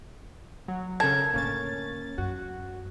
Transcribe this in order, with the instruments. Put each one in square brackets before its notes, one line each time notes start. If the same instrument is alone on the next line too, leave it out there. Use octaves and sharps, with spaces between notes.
[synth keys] F#3
[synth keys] C#3 A4 A#4 [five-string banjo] A5 [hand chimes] G#6
[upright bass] A2 D3 [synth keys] A#3 C#4 A6
[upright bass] F#2 [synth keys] F#4